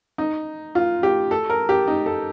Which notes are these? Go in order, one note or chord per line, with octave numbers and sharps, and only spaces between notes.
D#4
F4
G4
A4
A#4
G4
D#4
A4